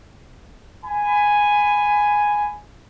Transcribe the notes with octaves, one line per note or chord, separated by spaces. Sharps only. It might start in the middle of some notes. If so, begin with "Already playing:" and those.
G#5 B5